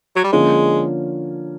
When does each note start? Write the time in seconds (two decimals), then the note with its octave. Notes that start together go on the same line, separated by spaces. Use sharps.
0.16 F#3
0.24 G3
0.32 D3 F3 G#3 A#3 C#4 F4